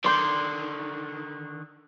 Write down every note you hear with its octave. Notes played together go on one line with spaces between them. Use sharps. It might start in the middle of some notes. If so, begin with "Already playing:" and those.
D3 D#3 D5 C6 G6